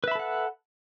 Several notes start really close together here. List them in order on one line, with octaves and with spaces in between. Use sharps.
B4 E5 B5 A4 F#5